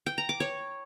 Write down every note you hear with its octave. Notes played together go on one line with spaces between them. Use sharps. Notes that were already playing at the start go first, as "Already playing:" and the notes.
G5
A#5
D6
C#5